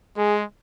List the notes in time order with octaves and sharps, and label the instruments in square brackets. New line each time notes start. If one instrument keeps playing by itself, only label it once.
[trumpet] G#3 [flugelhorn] G#4